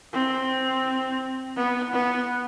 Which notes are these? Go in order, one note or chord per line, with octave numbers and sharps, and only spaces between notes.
C4
B3
B3